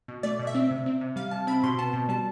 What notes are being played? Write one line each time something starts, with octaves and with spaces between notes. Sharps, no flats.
B2
A3 D5
B2
E5
C4
C3
C4
C3
G3 F5
C3 A5
C4 B5
B2 C6
B3 A5
B2
G3 A5